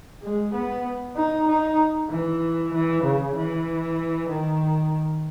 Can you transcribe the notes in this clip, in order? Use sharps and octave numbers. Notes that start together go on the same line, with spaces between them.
G#3
B3
D#4
D#4
E3
E3
C#3
E3
D#3